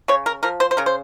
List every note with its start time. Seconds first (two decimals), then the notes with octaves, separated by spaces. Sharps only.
0.08 C#3 C#5
0.26 A#4
0.43 F3 A#4
0.60 C5
0.71 C5
0.77 C#3 A#4
0.86 C5